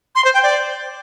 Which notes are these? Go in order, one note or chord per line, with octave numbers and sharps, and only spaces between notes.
C6
C5
G5
D5